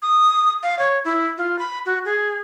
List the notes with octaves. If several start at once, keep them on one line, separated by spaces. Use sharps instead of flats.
D#6
F5
C#5
E4
F4
B5
F#4
G#4